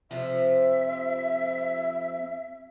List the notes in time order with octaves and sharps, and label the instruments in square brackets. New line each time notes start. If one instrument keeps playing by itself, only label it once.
[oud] F2 C3 F3 [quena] E5